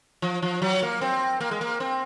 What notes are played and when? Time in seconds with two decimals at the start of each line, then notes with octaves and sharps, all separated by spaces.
0.22 F3
0.42 F3
0.62 F#3
0.82 A#3
1.01 C4
1.41 A#3
1.51 G#3
1.61 A#3
1.80 C4